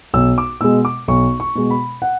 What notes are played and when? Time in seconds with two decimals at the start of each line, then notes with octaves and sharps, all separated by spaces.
0.14 B1 E6
0.38 D6
0.61 B2 G#3 E6
0.85 D6
1.08 B1 C#6
1.40 C#6
1.55 B2 G#3
1.70 B5
2.02 F#5